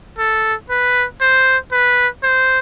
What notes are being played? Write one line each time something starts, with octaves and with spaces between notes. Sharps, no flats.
A4
B4
C5
B4
C5